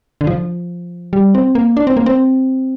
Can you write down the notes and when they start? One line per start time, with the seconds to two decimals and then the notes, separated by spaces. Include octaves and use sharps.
0.21 D3
0.27 F3
1.13 G3
1.35 C4
1.55 A#3
1.77 D4
1.87 C4
1.97 A#3
2.06 C4